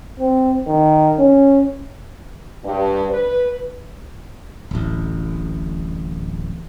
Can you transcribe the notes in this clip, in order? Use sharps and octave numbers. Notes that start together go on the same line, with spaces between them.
C4
D#3
C#4
G2
B4
D1 A1